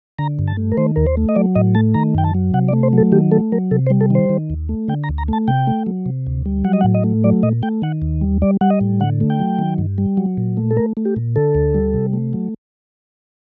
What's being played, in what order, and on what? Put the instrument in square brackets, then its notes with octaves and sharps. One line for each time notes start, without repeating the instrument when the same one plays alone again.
[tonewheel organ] D3 A#5
G2
A5
A3
A#4
D#3 C5
D#2 A#4
C5
A3
D#5
F#3 D5
A2 D#5
A3 A5
D#3 A#5
F#2 G5
A5
F#3
C3 F#5
D5
A3
C5
F#3 A4
D#3 G4
A3 A4
F#3 A#4
C3 A4
C5
G3
A4
D#3 C5
D#3
D#2
A3
D3 G5
A#5
D2
A#5
A3 A5
C3 G5
A3
F#3
C3
D2
G3
F#3 F#5
D#5
F#5
A2
D#5
A3
F#3 D5
A#2 D#5
A3 G5
D#3 F#5
D#2
G3
G3 D5
G3 F#5
D#5
A2
D3 F#5
A3
G5
F#3
D#3
G2
G3
F#3
A#2
A3
A4
A3 A#4
A3
G4
A#2
D3 A4
D2
G3
C3
A3
F#3